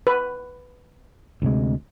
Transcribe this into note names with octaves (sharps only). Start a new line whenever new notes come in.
B4
D2 C3 G#3